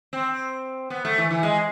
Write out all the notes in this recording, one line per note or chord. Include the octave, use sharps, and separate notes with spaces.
C4
B3
A3
E3
E3
G#3